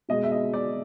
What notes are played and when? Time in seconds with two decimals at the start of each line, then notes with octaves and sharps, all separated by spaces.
0.09 B2 G#3 D#5
0.24 E5
0.32 D#5
0.53 D5